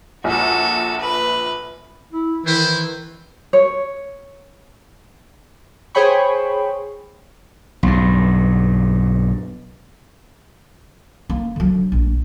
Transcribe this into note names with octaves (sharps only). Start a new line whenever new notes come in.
A#1 F#4 A4
B4
E4
D#3 E3 E4 B4 C5
C#5
G#4 C5 C#5 G5 B5 C#6
B1 G2
A#3
D3 F#3
A#1